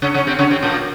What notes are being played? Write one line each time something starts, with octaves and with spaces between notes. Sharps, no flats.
C#3 C#4
C#3 C#4
C3 C4
C#3 C#4
C3 C4
A#2 A#3